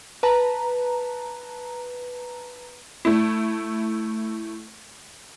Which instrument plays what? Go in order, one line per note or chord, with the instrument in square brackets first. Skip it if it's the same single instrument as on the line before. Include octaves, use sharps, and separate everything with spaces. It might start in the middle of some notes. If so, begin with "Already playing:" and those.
[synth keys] B4 A5 A#5
[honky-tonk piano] A3 E4